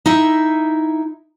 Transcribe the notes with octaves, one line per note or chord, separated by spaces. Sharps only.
D#4 E4 E5